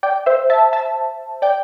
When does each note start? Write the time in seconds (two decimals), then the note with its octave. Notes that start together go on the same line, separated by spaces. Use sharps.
0.03 D5 G5
0.26 C5 E5
0.50 E5 A5
0.73 E5 A5
1.42 D5 G5